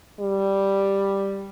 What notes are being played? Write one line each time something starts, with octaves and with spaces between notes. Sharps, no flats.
G3